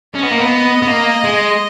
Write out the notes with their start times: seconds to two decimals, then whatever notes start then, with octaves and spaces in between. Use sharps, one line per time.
0.15 C#4 D#5
0.23 B3
0.32 A#3
0.40 B3
0.82 B3
0.88 A#3
1.24 G#3